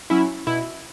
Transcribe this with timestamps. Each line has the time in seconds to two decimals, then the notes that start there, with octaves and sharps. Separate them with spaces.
0.10 F#3 C#4 E4
0.47 B2 E4